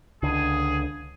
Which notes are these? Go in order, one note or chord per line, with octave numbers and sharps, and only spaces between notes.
C#2 D3 G#4